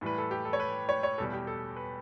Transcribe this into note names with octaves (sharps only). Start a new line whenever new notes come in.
A2 E3 G3 B4
A4
G4
A4
C#5
B4
C#5
C#5
E2 B2 G3 A4
G4
A4
B4